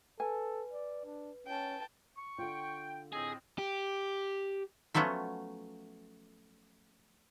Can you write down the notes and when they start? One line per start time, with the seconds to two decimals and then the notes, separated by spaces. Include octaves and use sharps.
0.20 A4 B4 G#5
0.73 D5
1.05 D4
1.47 C#4 G5 A5
2.17 C#6
2.38 D3 F4 G5
3.13 A2 C4 G#4 D#5
3.58 G4
4.94 F3 F#3 A3 B3 C#4